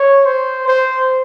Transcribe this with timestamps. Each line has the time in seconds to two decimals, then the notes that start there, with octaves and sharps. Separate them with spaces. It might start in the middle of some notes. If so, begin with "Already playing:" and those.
Already playing: C#5
0.26 C5
0.68 C5